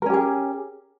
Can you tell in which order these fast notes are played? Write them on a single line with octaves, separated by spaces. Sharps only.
A#4 C#4 G4 G#4